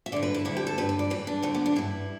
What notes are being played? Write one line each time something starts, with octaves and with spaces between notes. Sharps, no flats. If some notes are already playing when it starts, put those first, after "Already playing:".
E5
G2 D3 D5
B4
E4
D2 D3 E4
G4
A4
G2 D3 B4
B4
D5
E2 E3 B4
D4
D2 D3 A3
B3
D4
G2 E3 E4